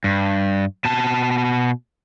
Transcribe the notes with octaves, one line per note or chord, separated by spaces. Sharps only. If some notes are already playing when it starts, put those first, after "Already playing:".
G2
B2 A5